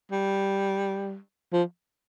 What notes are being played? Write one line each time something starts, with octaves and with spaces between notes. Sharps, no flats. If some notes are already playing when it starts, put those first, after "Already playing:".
G3
F3